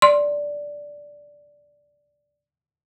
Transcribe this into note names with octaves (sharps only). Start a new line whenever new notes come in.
D5 C6